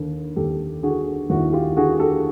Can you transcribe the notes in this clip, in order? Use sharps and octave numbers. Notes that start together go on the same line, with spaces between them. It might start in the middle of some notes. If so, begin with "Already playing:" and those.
Already playing: D#2 D3
D#2 G4 A4
D3 F#4 G#4
D#2 E4 F#4
F4 G4
D3 F#4 G#4
G4 A4